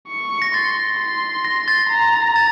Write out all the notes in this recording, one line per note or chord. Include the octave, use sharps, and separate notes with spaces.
C#6
A#6
C6 A6
C6
A#6
A6
A#5
A6